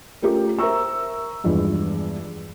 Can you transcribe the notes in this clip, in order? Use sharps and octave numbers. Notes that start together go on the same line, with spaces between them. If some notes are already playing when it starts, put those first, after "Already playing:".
A3 C#4 F4 G4 A#4
A#4 C5 E5 A#5 C#6 E6
E2 G2 E3 F3 G#3